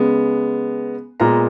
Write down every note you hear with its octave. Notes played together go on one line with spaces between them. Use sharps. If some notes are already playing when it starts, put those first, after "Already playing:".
Already playing: C#3 G#3 B3
A#2 G#3 B3 A#5